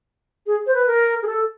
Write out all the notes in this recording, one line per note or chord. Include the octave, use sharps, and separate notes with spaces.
G#4
C5
B4
A#4
G#4
A4